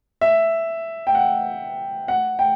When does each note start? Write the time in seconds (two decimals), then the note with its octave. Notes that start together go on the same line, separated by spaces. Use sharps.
0.21 E5
1.07 G5
1.15 F#5
2.08 F#5
2.39 G5